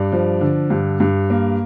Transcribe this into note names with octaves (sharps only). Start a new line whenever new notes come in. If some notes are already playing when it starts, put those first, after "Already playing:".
Already playing: G2 D5
F3
D3
G2
G2
A#3